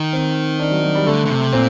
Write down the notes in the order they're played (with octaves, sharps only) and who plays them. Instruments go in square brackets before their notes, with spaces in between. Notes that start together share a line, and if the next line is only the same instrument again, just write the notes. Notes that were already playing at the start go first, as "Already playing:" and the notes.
Already playing: [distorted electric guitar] D#3
[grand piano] C4
D4
F#3
F#3
G3
[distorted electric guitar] D3 [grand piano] A3
[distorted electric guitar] D3
C3
[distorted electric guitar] A#2 [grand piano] C4